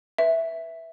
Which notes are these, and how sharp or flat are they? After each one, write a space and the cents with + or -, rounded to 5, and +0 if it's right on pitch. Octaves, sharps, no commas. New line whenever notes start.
B4 -15 E5 +0